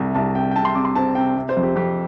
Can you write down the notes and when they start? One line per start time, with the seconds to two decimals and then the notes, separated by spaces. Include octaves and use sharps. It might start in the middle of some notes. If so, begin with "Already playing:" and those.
Already playing: C2 C3
0.15 C2 A5
0.35 C3 G5
0.51 G5
0.55 C3 A5
0.65 C6
0.75 C3 D6
0.85 C6
0.95 C4 A5
1.15 C3 G5
1.36 C3
1.49 C5
1.57 F2
1.63 G4
1.76 F2 G4